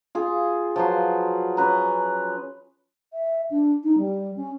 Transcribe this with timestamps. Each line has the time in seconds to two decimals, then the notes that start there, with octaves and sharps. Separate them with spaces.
0.15 F4 G#4
0.76 F3 F#3 B4 C6
1.57 C#4 B4 A#5
3.13 E5
3.51 D4
3.84 D#4
3.98 G3
4.36 C#4